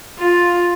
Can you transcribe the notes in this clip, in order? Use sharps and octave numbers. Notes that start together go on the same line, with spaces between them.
F4